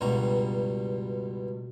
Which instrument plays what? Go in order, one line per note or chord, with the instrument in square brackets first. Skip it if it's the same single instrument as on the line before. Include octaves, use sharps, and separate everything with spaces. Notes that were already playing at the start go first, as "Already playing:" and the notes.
[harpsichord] C#2 G2 B2 G3 F#4 A#5